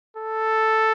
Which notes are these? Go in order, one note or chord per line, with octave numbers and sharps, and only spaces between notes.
A4